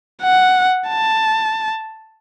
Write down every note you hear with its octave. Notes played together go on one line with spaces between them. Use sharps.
F#5
A5